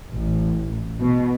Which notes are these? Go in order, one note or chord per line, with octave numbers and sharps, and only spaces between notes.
A1
B2